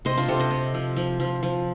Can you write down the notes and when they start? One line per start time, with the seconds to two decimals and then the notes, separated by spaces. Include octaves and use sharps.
0.05 C3 C5 D#5
0.17 D4 F4
0.28 C3 A4 C5
0.40 C5 D#5
0.51 C3
0.74 F3
0.96 F3
1.20 F3
1.43 F3